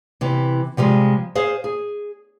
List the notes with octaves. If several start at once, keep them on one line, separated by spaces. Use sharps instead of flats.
C3 E3
C3 F3 G3 G#3
G#4 C5 F5
G#4